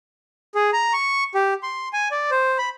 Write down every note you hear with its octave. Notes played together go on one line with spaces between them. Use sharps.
G#4
A#5
C#6
G4
C6
G#5
D5
C5
B5